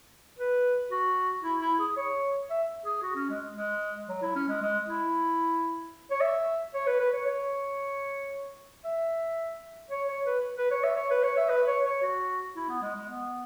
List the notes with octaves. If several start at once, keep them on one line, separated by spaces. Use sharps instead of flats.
B4
F#4
E4
E4
G#4
C#5
E5
G#4
F#4
C#4
G#3
G#3
F#3
E4
C#4
G#3
G#3
E4
C#5
E5
C#5
B4
B4
C#5
C#5
E5
C#5
C#5
B4
B4
C#5
E5
C#5
B4
C#5
E5
B4
C#5
C#5
F#4
E4
B3
G#3
G#3
B3